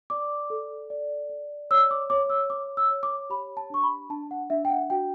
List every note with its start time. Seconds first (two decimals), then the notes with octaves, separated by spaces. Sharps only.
0.10 D5 D6
0.50 A4
0.90 D5
1.30 D5
1.71 C#5 E6
1.91 D6
2.10 C#5 D6
2.30 E6
2.50 C#5 D6
2.77 E6
2.91 C#5
3.03 D6
3.30 G4 B5
3.57 A5
3.70 D4 C#6
3.83 B5
4.10 D4 A5
4.31 F#5
4.50 D4 E5
4.65 G5
4.70 F#5
4.90 F#4 G5